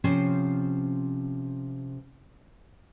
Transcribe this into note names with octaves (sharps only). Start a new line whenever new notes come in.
C3 F3 C#4 F4 C5